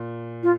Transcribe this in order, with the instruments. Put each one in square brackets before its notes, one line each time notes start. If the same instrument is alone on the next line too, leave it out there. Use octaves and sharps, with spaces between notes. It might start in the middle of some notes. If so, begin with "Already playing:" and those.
Already playing: [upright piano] A#2
[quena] F4